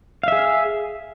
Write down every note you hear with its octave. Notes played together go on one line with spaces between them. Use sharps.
G#4 E5 F5